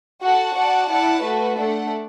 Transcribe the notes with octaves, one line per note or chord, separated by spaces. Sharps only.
F#4 A4 F#5 A5
F#4 D5 F#5 A5
E4 D5 F#5 A5
A3 F#4 B4
A3 D4 A4 D5 F#5